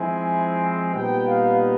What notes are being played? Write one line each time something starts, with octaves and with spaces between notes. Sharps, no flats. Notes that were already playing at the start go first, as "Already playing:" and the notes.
Already playing: F3 G#3 C4 E4 G#5
A#2 G3 B3 D#4 G5
F5